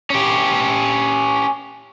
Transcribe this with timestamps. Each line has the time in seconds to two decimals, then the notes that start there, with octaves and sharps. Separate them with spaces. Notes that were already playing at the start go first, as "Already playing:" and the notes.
0.10 C#4 G4